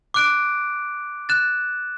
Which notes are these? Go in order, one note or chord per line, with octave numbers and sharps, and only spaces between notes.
D6 F#6 D7
F#6 A6 E7